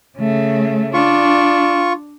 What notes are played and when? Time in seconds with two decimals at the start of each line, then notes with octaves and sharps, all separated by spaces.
0.18 C#3 A3
0.94 D4 F4 C#6